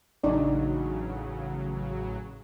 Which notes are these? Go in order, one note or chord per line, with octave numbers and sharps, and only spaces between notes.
A1 C#3 F#3 D4 D#4 D5